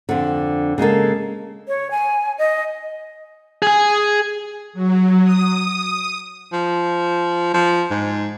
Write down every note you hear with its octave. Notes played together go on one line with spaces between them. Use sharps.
F2 D3
C#3 G#3 A#3 A4
C#5
G#5
D#5
G#4 G#5
F#3
D#6
F3
F3
G#2